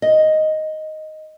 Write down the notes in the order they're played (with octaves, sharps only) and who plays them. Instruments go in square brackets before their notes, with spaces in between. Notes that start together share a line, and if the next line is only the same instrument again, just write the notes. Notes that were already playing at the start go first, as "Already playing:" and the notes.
[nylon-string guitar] D#5